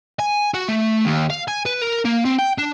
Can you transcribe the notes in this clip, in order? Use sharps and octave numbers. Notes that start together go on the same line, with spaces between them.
G#5
F#4
A3
D#2
F5
G#5
B4
A#4
A#3
C4
G5
D4